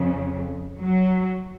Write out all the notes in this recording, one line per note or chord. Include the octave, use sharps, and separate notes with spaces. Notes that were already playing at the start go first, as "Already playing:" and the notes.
Already playing: F2 C#3
F#3